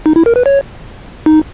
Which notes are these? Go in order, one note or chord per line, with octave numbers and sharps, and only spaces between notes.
D#4
E4
A#4
B4
C#5
D#4